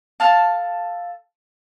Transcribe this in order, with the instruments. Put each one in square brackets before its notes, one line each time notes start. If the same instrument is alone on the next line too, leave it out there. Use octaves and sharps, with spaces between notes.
[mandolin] A4 F5 A5